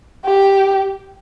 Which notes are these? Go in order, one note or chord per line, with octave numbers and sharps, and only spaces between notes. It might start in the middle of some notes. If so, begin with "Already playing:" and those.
G4